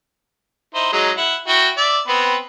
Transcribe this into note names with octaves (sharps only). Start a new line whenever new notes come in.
D#4 E4 C5
F#3 G#3 D#4
E4 F#5
E4 F#4 G5
D5 E5
B3 C4 B4